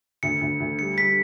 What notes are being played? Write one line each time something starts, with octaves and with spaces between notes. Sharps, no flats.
D2 C#7
D2
D2
G3 C#7
G3 B6